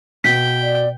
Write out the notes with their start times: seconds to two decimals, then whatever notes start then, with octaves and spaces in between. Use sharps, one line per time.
0.24 B2 G5 B6
0.62 D5